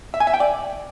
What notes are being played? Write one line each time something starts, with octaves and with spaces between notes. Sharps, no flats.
E5
G#5
E5
G5
D5